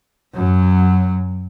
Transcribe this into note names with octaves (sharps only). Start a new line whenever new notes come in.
F#2 F#3